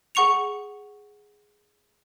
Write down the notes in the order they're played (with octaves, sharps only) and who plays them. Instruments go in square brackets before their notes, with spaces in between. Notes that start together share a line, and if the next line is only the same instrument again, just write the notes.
[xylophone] G#4 F#5 C#6 C#7 F7